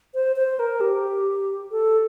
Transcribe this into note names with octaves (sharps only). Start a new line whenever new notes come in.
C5
C5
A#4
G4
A4